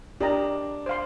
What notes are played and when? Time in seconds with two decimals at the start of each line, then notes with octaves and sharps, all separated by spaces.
0.20 D4 G4 A#4 D#5 A#5
0.86 C5 F5 C6